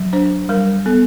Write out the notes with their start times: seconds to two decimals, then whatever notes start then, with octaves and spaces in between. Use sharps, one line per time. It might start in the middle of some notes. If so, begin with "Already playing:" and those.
Already playing: F#3
0.13 D4 C5
0.49 G3 A#4
0.86 B3 A4